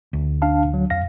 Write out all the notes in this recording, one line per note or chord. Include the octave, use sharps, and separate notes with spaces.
D2
D4 F5 A5
F#3
F2 F5 A#6